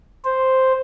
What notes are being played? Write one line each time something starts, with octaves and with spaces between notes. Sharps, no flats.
C5